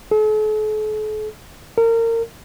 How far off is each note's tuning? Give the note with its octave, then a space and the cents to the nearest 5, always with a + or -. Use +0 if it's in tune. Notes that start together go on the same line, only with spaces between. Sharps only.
A4 -45
A#4 -30